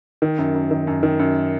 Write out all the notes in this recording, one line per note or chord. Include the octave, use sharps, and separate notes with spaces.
D#3
F#2
F#2
D#3
F#2
D#3
F#2